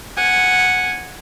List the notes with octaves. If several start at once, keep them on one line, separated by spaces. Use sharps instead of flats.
F#5 G#5